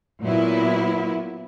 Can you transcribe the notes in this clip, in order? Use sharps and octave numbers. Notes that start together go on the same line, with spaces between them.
A#2 F#3 B3 E4